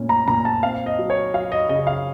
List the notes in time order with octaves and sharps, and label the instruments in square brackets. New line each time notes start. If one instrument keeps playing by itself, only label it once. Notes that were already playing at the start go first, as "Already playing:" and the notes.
Already playing: [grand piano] A#2 A3 C#4
A#5
A#2 A#5
A5
C4 F5
D#5
F#3
C#5
F#3 F5
D#5
C#3 D#5
D#5
F5